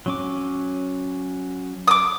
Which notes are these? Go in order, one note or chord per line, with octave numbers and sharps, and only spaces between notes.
F#3 C#4 D6
D6 D#6